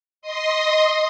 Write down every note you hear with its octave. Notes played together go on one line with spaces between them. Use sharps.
D#5 C6 D#6